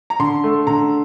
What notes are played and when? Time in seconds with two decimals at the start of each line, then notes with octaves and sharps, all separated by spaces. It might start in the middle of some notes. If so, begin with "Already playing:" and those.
0.10 A#5
0.20 D3 C6
0.44 A3
0.67 D3 A#5